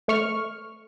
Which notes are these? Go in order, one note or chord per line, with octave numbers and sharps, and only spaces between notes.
A3 C#6 F6